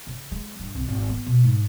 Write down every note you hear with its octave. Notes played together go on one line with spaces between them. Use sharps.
C#3
G#3
G2
C2
G#1
B3
B2
G#2